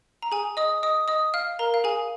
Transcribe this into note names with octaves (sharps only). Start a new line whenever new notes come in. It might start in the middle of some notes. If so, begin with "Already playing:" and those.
A#5
G#4 G#5
D#5 D#6
D#5 D#6
D#5 D#6
F5 F6
A#4 A#5
F5
G#4 G#5